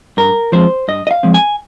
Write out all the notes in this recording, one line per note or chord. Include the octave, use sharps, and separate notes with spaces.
G2 A#4
F3 G#3 C4 C5
G2 D#5
D#5
F5
F3 G#3 C4
G#5